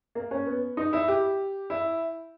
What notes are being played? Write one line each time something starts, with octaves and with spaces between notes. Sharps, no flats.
A#3
C#4
B3
D#4
E4
G4
E4